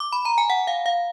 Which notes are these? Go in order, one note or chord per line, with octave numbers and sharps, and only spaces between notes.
D6
B5
A#5
G#5
F#5
F5
F5